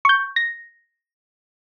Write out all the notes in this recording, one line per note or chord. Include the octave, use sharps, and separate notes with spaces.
C#6 G6
A#6